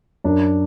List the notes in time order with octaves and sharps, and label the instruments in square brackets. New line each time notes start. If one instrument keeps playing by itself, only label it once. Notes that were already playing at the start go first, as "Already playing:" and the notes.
[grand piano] F#2 D4